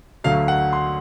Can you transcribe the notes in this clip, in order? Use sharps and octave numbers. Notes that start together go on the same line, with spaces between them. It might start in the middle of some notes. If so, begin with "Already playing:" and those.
D2 D3 F#3 A3 F5
F#5
C6